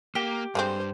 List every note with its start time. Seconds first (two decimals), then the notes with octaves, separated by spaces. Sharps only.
0.15 A#3 G4
0.55 G2 D3 G#3 C4 C5